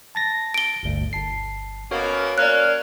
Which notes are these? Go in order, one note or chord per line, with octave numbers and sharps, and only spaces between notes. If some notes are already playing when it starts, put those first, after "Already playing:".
A5 A6 A#6
D7 G7
G1 D2 G2
G1 A5 C7
B2 A#3 C#4 F#4 C#5
A#3 C#4 D5 F5 F#6